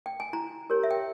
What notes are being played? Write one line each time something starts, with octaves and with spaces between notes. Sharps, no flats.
G5
G#5
E4 A#5
G4 A#4 C#5
E5
G5